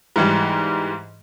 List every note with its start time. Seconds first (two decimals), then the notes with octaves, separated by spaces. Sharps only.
0.16 G#2 E3 G3